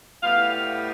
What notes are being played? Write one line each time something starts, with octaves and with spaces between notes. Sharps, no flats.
A2 G3 B3 F5